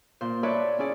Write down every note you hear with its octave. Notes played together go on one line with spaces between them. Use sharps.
A#2 C5
B4 C#5 D5 E5 A5 B5
C#4 E4 G#4 D5